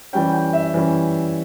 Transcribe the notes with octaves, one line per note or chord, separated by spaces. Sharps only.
E3 G3 C#4 G5
G5
E5
E3 G3 C#4